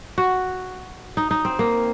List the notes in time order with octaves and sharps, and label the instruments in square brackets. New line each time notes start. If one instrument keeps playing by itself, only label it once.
[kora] F#4
D#4
D#4
C4
A#3